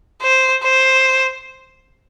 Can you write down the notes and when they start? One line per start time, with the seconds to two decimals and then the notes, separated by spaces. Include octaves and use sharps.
0.22 C5
0.63 C5